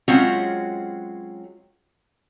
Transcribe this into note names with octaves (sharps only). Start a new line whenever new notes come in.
F#3 G#3 C4 C#4 F4 F#4